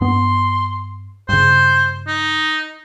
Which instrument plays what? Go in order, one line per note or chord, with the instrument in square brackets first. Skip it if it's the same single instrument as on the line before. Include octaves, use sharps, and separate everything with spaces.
[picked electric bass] G2 B3 [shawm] C6
[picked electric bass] G2 C#3 [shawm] C5
[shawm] D#4